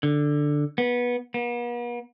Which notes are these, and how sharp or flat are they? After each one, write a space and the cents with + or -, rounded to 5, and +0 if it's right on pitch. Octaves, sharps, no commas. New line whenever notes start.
D3 +5
B3 -20
B3 -45